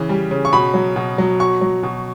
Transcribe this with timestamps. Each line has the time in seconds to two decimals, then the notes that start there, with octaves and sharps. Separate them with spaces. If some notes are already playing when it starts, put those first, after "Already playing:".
Already playing: C#3 E3
0.09 G3
0.31 C#3
0.45 C#6
0.53 B2 B5
0.74 F#3
0.96 B2
1.18 F#3
1.40 B2 C#6
1.61 F#3
1.83 B2